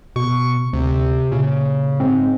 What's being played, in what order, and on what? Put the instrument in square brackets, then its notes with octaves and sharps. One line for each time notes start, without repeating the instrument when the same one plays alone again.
[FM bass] B2 [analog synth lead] C#6
[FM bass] D2 [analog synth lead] C3
[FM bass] A#2 [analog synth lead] C#3
[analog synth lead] G#2 [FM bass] C4